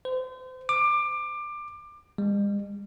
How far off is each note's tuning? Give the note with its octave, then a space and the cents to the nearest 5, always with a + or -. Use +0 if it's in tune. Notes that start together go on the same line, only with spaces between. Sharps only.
C5 -35
D6 +20
G#3 -45